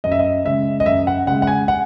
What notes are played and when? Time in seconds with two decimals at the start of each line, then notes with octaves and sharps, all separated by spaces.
0.04 F#2 D#5
0.12 E5
0.19 D#5
0.45 C#3 G#3 E5
0.80 D#5
0.86 F#2 E5
1.07 F#5
1.27 C#3 G#3 F#5
1.42 F#5
1.47 G#5
1.68 F#5